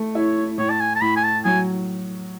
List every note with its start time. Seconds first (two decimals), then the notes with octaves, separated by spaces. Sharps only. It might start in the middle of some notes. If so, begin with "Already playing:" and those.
Already playing: A3
0.15 E4 C#5
0.58 A2 C#5
0.70 A5
0.80 G#5
0.96 A5
1.01 A2 B5
1.16 G#5
1.24 A5
1.45 F#3 G#5